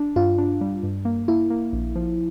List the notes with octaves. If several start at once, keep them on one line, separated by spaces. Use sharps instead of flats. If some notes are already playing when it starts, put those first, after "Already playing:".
Already playing: D4
G2 F4
D4
G3
G2
A#3
A#3 E4
A#3
A#1
F3